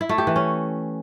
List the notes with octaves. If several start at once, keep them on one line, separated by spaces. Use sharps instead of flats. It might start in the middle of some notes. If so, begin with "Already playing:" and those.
E4
A3
G4
E3
C#4